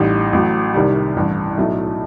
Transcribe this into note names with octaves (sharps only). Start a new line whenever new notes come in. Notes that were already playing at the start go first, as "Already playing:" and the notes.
Already playing: A1 A2 G3 D#4
A1 A2 F#3
C2 C3 D#3 G3
A1 G2 E3
B1 A2 F#3 A3